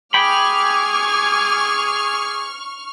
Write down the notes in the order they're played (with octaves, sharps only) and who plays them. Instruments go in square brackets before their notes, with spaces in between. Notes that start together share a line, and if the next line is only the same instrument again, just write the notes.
[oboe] G#4 [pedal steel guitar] G5 B5 [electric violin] G#5 D6 [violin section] C#6 F6